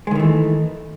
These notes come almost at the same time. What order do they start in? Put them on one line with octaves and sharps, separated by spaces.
G#3 D#3 E3 A3